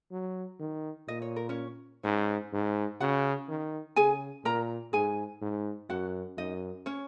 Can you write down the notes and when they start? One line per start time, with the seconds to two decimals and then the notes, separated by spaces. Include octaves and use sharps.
0.12 F#3
0.59 D#3
1.08 A#2 D#5
1.22 C#5
1.36 A#4
1.49 C#4 C#5
2.03 G#2 C#4 C#5
2.53 G#2
3.00 C#3 F#4 F#5
3.49 D#3
3.96 C#3 G#4 G#5
4.45 A#2 A#4 A#5
4.93 G#2 G#4 G#5
5.42 G#2
5.90 F#2 F#4 F#5
6.38 F#2 D#4 D#5
6.86 C#4 C#5